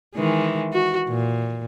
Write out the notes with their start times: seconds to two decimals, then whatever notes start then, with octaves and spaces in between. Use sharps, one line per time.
0.15 D#3 E3 G#3
0.72 F#4
1.09 A#2